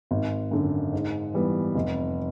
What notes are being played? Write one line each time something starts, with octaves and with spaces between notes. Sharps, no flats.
G#1
F#2 D3
G#2
E3 G3 B3
F1